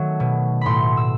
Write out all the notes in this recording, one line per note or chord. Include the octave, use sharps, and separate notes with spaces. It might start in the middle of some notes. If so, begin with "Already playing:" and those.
Already playing: D#3 F#3 A3
B2
A2 B5 C6
E6